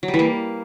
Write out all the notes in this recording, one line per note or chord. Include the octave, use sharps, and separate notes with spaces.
F#3
G3
E3
A#3